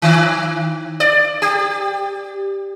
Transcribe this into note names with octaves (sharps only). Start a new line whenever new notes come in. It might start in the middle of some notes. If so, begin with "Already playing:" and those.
D#3
D5
G4